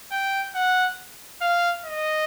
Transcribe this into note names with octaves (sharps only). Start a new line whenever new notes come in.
G5
F#5
F5
D#5